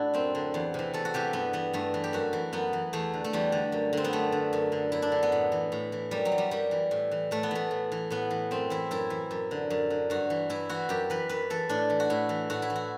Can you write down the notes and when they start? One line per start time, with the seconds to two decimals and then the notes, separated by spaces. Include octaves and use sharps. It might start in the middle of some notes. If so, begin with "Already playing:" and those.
Already playing: A2 D4 E4 F#4
0.14 F#2 C4
0.35 D3
0.54 E2
0.74 C3 E3
0.94 E2 A4
1.05 F#4
1.14 C3 E3 G4
1.33 G2 B3
1.53 E3 B3
1.73 G2 A3
1.94 E3
2.04 G4
2.13 F#2 F#4
2.33 E3
2.53 F#2 B3
2.73 E3
2.93 E2 A3
3.14 D3
3.24 A3
3.33 E2 G3
3.52 D3
3.72 F#2
3.93 D3 C4
4.04 B3
4.13 F#2 A3
4.32 D3
4.53 F#2
4.72 D3
4.92 F#2 E4
5.02 D4
5.12 D3
5.23 B3
5.32 A2
5.52 E3
5.72 A2
5.92 E3
6.11 F#2 G3
6.25 F#3
6.32 E3
6.38 G3
6.51 F#2 G3
6.71 E3
6.91 A2
7.11 E3
7.31 A2 A3
7.43 B3
7.51 E3 A3
7.71 A2
7.92 E3
8.10 A2 B3
8.30 E3
8.51 F#2 C4
8.70 E3 E4
8.91 F#2 E4
9.10 E3
9.31 F#2
9.51 D3
9.70 F#2
9.90 D3
10.10 G2 F#4
10.30 E3
10.50 G2 E4
10.69 E3 F#4
10.89 F#2 G4
11.10 E3 B4
11.29 F#2 B4
11.50 E3 A4
11.69 A2 D4
11.90 E3
12.00 F#4
12.10 A2 E4
12.29 E3
12.50 A2 F#4
12.62 E4
12.70 E3
12.76 F#4